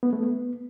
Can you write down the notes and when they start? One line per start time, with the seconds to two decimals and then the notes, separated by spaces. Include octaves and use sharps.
0.03 B3
0.13 A3
0.23 B3